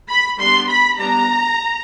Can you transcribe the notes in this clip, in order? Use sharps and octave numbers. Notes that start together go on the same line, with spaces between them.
B5
G3 B3 D4 C6
B5
G3 B3 D4 A#5